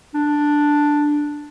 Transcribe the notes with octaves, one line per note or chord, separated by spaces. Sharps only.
D4